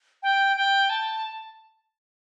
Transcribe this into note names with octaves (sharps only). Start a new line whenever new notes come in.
G5
G5
A5